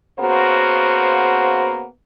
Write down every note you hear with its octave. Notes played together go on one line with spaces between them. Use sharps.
C#3 A#3 B3 F#4 C5